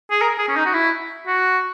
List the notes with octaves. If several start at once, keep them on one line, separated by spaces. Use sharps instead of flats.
G#4
A#4
G#4
C#4
D#4
F#4
E4
F#4